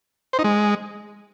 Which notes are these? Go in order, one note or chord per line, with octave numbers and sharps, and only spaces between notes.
C5
D#4
G#3